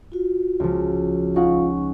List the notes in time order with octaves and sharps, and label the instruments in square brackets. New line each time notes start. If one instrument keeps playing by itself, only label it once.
[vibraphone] F4 F#4
[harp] C#2 F3
[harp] C#4 D#4 F#5 [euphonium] F4 [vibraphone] C#6